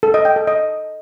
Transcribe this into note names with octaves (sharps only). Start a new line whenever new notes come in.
A4
D#5
G5
A4
D#5